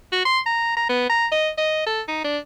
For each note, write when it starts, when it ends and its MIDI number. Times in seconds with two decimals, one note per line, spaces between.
0.12 0.25 66
0.25 0.40 84
0.46 0.76 82
0.77 0.85 82
0.89 1.05 59
1.09 1.27 82
1.32 1.49 75
1.58 1.86 75
1.86 2.01 69
2.08 2.22 63
2.24 2.38 62